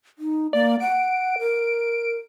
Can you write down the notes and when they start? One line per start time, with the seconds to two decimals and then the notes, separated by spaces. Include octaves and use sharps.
0.19 D#4
0.53 A#3 D5
0.80 F#5 D7
1.39 A#4